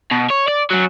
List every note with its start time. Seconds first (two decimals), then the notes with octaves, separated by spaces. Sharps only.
0.11 B2
0.30 C#5
0.48 D5
0.70 F#2 F#3